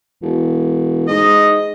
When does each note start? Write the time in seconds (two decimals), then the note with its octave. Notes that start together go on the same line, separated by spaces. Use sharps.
0.22 E1
1.08 G#2 D#5